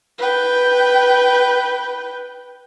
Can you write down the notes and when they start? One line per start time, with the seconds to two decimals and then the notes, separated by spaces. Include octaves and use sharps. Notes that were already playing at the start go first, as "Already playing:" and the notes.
0.19 B4 G5